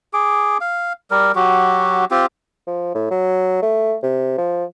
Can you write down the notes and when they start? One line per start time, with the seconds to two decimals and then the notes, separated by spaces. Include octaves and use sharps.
0.13 G#4 D6
0.61 F5
1.11 G3 A#4
1.35 F#3 F#4 G4
2.11 C4 F4 G4
2.67 F3
2.95 A2
3.11 F#3
3.62 A3
4.03 C3
4.38 F3